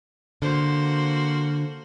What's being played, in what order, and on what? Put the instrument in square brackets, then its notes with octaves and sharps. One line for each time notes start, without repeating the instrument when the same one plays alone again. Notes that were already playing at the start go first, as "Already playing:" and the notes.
[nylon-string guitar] D3 [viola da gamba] A#3 F#4 C5